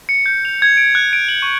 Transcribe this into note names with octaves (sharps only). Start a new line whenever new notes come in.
C#7
G6
F7
G#6
D7
F#6
D7
F#7
C#6